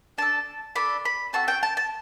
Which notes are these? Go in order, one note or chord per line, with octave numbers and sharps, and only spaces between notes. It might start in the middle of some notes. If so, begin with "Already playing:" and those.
D4 A4 A5
D4 A4 B5
B5
C4 F#4 A4 A5
G5
A5
A5